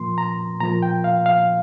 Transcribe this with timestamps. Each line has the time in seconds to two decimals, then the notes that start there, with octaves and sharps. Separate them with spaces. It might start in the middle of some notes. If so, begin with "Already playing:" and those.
Already playing: A#2 F3 A#3 C6
0.18 A#5
0.60 A#2 F3 A#3 A#5
0.82 G5
1.04 F5
1.26 F5